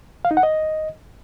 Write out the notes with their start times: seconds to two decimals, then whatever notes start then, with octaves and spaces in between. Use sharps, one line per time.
0.25 F5
0.31 D#4
0.37 F#5
0.43 D#5